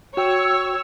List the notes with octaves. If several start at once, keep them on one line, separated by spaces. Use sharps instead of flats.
F#4 C#5 G5 E6